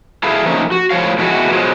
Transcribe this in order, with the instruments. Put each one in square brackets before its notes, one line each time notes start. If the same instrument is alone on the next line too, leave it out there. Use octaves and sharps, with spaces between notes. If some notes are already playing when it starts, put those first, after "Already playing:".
[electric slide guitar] E4 G#4 A4 B4 E5 F5
F3 A3 A#3 C4 C#4 D#4
F#4
A2 F3 C#5 F5
B2 E3 G#3 A3 E4 F#4
B2 F3 F#3 G#3